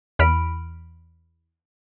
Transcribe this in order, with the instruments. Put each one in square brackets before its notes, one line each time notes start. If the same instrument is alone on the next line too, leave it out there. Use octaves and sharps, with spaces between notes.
[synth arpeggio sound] E2 B5 F6 D7